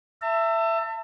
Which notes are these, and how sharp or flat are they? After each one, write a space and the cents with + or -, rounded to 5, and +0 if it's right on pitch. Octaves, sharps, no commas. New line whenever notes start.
E5 +15 A5 +40